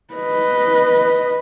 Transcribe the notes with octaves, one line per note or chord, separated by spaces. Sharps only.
B4 D#5